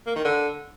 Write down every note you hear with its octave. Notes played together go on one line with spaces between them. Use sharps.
A#3
D#3
D3